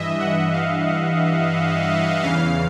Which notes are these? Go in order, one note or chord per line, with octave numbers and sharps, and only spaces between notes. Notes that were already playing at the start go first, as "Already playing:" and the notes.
Already playing: G2 E3 D#5 E5
F#5
F5
F#5
E2 C#3 E3 F5